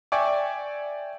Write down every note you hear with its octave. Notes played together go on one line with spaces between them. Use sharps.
D5 E5 G5 G#5 C#6 D6